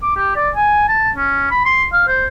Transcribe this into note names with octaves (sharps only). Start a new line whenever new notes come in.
D6
G4
D5
G#5
A5
C#4
B5
C6
F5
C5